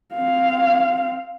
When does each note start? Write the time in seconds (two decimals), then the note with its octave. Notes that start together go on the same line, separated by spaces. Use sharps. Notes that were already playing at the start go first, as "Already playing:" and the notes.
0.14 C4 F5